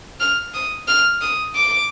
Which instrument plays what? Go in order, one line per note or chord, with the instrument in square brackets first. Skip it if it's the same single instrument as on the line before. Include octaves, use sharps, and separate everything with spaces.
[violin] F6
D#6
F6
D#6
D6